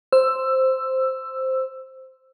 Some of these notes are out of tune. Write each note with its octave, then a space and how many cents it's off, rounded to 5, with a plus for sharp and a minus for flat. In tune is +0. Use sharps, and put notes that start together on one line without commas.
C5 +0 E6 +10